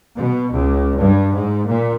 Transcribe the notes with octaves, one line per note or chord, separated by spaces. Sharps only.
B2
C#2
G2
G#2
A#2